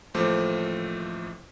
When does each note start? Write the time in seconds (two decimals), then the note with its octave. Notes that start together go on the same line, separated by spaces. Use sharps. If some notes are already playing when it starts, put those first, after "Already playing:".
0.14 A1 D#2 F3 A3 C5 D6